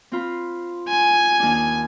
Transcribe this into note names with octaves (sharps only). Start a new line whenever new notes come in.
C4 F4 B5
G#5
D#2 D4